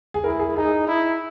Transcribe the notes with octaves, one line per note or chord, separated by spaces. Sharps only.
G#4
E4 A#4
G#4
D#4 G#4
E4